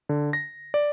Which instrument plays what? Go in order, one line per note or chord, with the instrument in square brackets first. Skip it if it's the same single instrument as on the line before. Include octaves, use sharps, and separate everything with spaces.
[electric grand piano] D3
A#6
D5